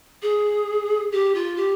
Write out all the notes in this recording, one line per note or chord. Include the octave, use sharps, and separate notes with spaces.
G#4
G4
F4
G4